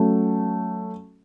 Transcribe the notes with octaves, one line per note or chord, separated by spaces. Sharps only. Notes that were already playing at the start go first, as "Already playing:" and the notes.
Already playing: F#3 A3 C#4